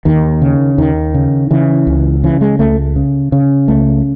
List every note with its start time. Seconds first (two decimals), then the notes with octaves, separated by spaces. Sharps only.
0.05 D#2 D#3
0.42 C#3
0.78 D#2 D#3
1.14 C#3
1.51 C#3 E3
1.87 C#2
2.24 C#3 E3
2.41 G#3
2.59 C#2 A3
2.96 C#3
3.32 C#3
3.68 C#2 A3